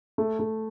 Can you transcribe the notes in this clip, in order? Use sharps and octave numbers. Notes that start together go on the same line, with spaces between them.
A3
A3